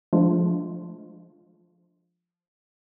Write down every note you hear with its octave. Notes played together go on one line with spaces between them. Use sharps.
F3 G#3 A3 D4 F4